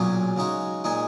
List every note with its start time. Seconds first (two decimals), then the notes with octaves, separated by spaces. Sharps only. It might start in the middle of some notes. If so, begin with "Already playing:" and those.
Already playing: B1 A#2 F#3 C#4 G#4
0.36 C#3 G#3 D#4 F#4
0.84 A#2 G#3 D#4 G#4